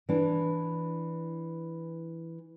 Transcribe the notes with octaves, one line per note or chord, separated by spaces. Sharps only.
E3 D4